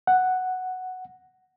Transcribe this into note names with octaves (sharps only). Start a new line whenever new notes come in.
F#5